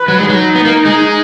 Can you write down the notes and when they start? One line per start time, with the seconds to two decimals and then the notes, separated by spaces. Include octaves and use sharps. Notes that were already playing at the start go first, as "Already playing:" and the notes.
Already playing: B4
0.08 F#3
0.18 G#3 D#4
0.29 F#3
0.55 B3
0.65 A#3
0.85 G#3